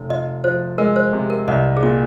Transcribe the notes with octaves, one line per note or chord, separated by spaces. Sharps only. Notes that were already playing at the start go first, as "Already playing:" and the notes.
Already playing: F1
F4 D#5
F3 C5
G#3 A#4
C5
C3
A#4
C2 D#5
G#4
A#2 F4